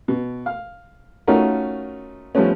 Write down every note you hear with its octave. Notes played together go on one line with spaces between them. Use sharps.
B2
F5
A3 C#4 D#4 F4 F#4 A#4
F3 G3 A3 B3 C#4